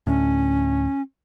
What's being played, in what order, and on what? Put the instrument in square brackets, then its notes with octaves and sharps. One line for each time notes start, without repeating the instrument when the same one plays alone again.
[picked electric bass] D2 A2 [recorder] C#4